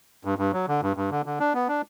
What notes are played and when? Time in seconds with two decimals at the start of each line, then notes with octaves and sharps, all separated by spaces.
0.25 G2
0.38 G2
0.53 F#3
0.68 D3
0.83 G2
0.97 G2
1.11 D3
1.26 D3
1.40 D4
1.54 B3
1.68 D4